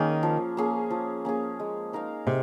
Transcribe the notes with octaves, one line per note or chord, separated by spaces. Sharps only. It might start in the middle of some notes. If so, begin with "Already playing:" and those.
Already playing: D#3 A#3 C#4 G#4
F3
A#3 C#4 G#4
F3
A#3 C#4 G#4
G#3
D#4 A#4 F5
C3 G#3